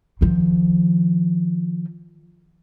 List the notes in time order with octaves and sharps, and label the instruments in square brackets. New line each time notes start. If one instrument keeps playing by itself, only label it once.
[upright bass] D#3 F3